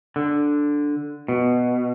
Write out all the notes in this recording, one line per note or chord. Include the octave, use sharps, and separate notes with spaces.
D3
B2